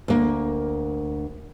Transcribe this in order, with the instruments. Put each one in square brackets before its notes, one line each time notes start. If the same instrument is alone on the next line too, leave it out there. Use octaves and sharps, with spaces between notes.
[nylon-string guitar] D2 A#3